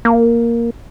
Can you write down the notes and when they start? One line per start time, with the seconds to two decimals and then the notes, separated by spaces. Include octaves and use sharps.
0.05 A#3